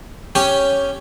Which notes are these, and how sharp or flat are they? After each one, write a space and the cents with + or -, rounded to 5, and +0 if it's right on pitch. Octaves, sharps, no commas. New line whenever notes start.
C#4 +0 G4 +5 G5 +0